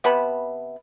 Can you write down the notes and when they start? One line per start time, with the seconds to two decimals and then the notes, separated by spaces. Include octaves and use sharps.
0.04 C3 B3 A5 B5